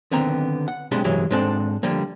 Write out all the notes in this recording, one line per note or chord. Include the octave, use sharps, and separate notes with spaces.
D3 D#3 B3 C4 A#5
F#5
B1 C3 G#3 D4 G4 B5
C2 G2 E3 F#3 G#3
G#2 G#3 C4 D4 A4
D3 F3 G3 A#3